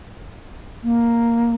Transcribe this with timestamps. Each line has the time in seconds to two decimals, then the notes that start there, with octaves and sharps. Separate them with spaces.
0.84 A#3